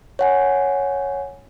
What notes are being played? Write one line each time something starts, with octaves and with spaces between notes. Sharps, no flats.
C#5 F#5 G#5